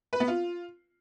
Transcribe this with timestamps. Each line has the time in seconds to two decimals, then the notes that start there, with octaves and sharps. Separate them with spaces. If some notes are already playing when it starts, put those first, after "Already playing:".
0.13 B4
0.20 B3
0.28 F4